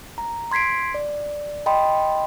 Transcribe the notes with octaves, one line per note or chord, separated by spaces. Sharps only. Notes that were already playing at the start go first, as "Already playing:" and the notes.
A#5
C6 G#6 B6 C7 D7
D5
D#5 G5 B5 C6